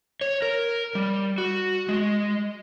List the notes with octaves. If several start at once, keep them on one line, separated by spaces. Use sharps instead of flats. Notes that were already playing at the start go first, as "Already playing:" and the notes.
C#5
A#4
G3
F#4
G#3